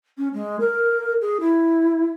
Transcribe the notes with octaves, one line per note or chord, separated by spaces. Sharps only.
C#4
G#3
A#4
G#4
E4